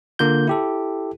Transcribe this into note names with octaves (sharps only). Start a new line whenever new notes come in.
D3 A#3 F4 G6
E4 G4 A4